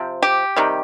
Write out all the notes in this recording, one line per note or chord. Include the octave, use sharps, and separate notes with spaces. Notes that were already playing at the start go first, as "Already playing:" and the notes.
Already playing: C3 F3 C4
G4
C3 D#3 G3